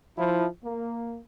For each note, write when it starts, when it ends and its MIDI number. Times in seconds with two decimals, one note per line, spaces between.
0.18 0.46 53
0.18 0.46 64
0.64 1.19 58